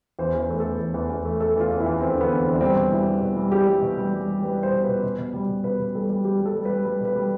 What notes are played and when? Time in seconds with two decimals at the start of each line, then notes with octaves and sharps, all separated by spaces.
0.19 E2 C5
0.35 E2
0.40 B4
0.50 A3
0.60 A4
0.65 E2
0.79 E2
0.94 E2
1.10 E2
1.25 A3
1.40 A3 A4
1.56 E2 F4
1.70 E2
1.80 E4
1.86 E2
2.00 E2 C4
2.15 D3
2.21 B3
2.31 E2
2.42 C4
2.47 E2
2.54 D4
2.61 G3 C4
2.76 B2
2.91 G3 E4
3.06 G3
3.22 B2
3.36 G3
3.52 G3 G4
3.67 G3
3.82 B2
3.98 G3
4.13 G3
4.28 G3
4.43 G3 B4
4.58 G3 C5
4.73 B2
4.84 B4
4.89 B2
5.04 B2
5.18 B2
5.34 G3
5.48 B2
5.64 B2 B4
5.79 B2
5.95 G3 A4
6.09 G3
6.24 G3 G4
6.40 G3
6.46 A4
6.55 G3
6.65 G3 B4
6.85 G3 B4
7.01 B2 B4
7.15 G3